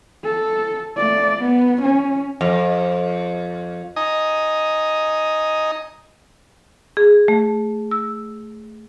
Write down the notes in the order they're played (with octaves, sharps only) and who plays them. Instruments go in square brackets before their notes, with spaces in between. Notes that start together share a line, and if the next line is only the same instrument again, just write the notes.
[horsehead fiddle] A4
A3 D5
B3
C#4
[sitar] F2
[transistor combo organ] D#4 D#5 G#5 D#6
[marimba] G#4
A3
E6